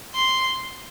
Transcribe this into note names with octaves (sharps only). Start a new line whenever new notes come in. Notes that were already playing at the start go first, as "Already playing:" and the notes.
C6